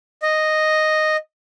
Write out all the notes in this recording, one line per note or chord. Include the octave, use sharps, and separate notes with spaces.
D#5